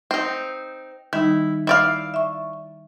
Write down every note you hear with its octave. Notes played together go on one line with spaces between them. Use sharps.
C4 D#4
D#3 G3 D#4 E4
E4 D5 F5
E5 C#6